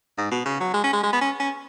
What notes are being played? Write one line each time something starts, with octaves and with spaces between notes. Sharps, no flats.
G#2
B2
C#3
F#3
G#3
C#4
G#3
G#3
B3
C#4
C#4